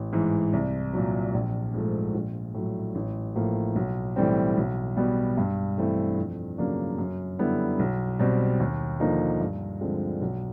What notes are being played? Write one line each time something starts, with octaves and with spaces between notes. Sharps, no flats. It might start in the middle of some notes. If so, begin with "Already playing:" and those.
Already playing: A1
G#2 E3
C2
A#2 F#3
A#1
G#2 F3 A3
A#1
A2 F#3
A1
A2 F3 A#3
B1
A2 E3 G3 C4
B1
B2 G3 B3
G2
E3 A3 C4 E4
F2
C#3 F#3 A#3 D4
F#2
D3 G3 B3 E4
B1
B2 G3 C4
D#2
D3 F3 A#3 D#4
G2
D3 F3 G#3 C4
B1